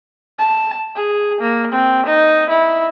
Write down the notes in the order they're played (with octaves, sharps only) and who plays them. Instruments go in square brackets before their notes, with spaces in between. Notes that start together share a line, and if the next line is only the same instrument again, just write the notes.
[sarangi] A5
G#4
A#3
C4
D#4
E4